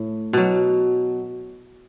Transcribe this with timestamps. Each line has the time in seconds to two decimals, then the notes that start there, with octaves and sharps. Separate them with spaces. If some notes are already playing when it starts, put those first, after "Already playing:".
Already playing: A2
0.33 B2 F#3